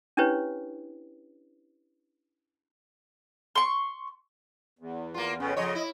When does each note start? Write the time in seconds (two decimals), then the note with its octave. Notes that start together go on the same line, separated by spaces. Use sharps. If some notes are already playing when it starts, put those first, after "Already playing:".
0.17 C#4 D4 E4 G4 B4 C#5
3.55 C6 C#6
4.79 E2
5.14 A#3 F4
5.40 F2 C#3 B3 C#4
5.57 F2 C#3 C#5 D#5
5.75 E4